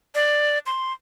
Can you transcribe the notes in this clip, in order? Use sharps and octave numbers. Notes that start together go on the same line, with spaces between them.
D5
C6